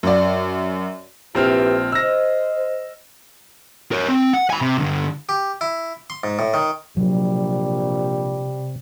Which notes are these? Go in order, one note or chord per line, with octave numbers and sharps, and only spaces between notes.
F#2 D5
A#1 C4 E4 G4 B4 F6
C5 D#5 E6 A#6
A#4 C#5
C4
F#5
G#5 B5
C3
G2 D3
G4
E4
C6
G#2
A2
D#3
A#1 C3 F#3 G3